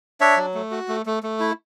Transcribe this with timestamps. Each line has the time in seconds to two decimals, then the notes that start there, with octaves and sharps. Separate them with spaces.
0.21 D4 C#5 E5
0.37 F#3
0.54 A3
0.71 F#4
0.88 A3
1.06 A3
1.23 A3
1.40 E4